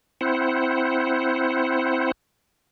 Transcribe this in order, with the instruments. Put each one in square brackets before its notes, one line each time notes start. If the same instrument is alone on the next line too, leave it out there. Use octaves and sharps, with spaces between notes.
[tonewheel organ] C4 E4 C5 F#5